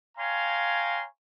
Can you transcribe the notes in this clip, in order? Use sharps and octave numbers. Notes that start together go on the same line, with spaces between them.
C#5 F5 G5 G#5 A#5 C6